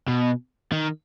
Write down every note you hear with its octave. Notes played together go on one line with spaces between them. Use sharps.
B2
D#3